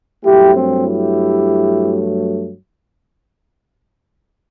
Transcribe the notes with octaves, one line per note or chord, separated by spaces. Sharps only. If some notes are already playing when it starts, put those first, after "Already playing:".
G2 F#3 A3 E4 G4
C4
E4 G4